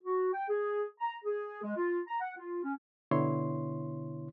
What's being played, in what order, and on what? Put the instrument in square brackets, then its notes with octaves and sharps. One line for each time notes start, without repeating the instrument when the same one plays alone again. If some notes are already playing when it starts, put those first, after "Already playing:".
[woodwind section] F#4
G5
G#4
A#5
G#4
G#3
F4
A#5
F#5
F4
C#4
[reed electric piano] B2 D3 B3 E4 C#5 C6